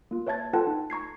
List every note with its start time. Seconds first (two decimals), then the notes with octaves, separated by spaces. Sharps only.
0.11 A#3 F4
0.27 B4 C#5 E5 A5 G#6 A6
0.53 F4 A4 B4 F#5 G5 A5
0.67 D#4
0.90 A#5 C#6 G#6 C7